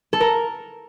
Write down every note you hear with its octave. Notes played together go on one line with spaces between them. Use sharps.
A4
A#4